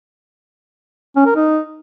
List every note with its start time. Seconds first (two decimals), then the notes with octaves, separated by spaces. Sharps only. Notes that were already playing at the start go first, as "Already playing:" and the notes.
1.16 C#4
1.26 A#4
1.35 D#4